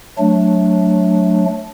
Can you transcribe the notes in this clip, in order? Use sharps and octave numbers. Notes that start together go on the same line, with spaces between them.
F#3 A3 D4